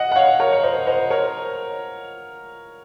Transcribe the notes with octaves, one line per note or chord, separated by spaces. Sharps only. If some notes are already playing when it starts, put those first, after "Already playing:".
Already playing: D#5 F#5
F#5
C#5 F5
A#4 C#5
C#5
C5 D#5
C5 D#5
A#4 C#5